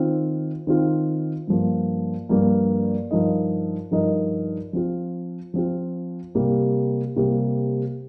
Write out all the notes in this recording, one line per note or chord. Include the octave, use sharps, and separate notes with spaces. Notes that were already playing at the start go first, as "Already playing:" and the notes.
Already playing: D#3 C4 F4
D#3 C4 F4
G2 F3 A#3
G2 F3 A#3
G2 F3 D#4 A#4 D#5
G2 F3 D#4 A#4 D#5
F3 C4 F4
F3 C4 F4
C3 G3 A#3
C3 G3 A#3